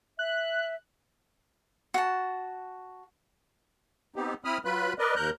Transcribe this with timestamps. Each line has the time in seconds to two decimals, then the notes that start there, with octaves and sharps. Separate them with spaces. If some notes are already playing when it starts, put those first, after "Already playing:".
0.19 E5 F#6
1.94 F#4 A5
4.16 B3 C4 D#4 G4
4.45 C4 E4 B5 D#6 F6
4.65 F#3 F4 B4 B5 F#6
4.99 A#4 B4 D5 D#5
5.16 D#2 A#4 A#5 F#6 G6